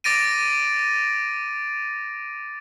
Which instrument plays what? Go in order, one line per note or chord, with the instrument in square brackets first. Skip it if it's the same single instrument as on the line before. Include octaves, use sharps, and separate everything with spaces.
[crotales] D6 A6 A#6 D7 D#7